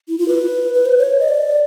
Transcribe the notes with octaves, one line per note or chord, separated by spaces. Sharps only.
E4
F4
B4
B4
C5
C#5
D#5
D5